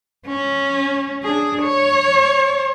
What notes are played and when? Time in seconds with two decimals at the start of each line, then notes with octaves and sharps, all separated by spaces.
0.27 C#4
1.23 D4 G#4
1.62 C#5